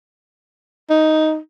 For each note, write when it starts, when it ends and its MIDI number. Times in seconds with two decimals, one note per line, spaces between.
0.90 1.38 63